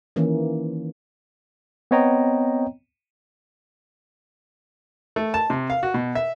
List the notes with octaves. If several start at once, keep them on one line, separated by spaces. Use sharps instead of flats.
D#3 E3 A#3 C#4
B3 C4 C#5 D#5 G5 A#5
A3
A5
C3
F5
F#4
B2
E5